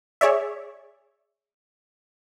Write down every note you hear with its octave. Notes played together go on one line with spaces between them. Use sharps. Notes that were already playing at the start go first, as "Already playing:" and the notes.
G#4 C#5 D5 E5